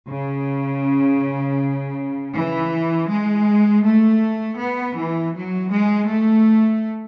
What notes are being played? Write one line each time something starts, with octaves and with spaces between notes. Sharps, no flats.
C#3
E3
G#3
A3
B3
E3
F#3
G#3
A3